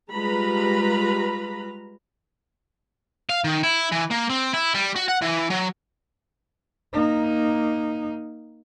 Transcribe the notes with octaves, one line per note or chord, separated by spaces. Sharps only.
G3 G#3 F4 B4 A#5 B5
F5
D#3
E4
E3
A#3
C4
E4
G3
F#4
F#5
E3
F#3
A#3 D#4